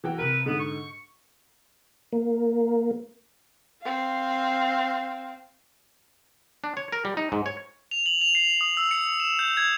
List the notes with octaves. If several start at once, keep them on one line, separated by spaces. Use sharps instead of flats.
E3 F#4 G5
C3 A#4 B4
G#2 D3 B3
C#6
A#3
C4 F5
D4
C#5
A#4
G3
D#4
G#2
C#5
F7
F#7
F7
C7
D#6
E6
C#7
E7
G6
G#6